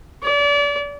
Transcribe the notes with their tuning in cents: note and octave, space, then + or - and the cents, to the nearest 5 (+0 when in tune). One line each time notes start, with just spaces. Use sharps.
D5 -35